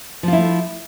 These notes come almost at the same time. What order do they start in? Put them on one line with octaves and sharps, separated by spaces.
F3 F4 E4 A3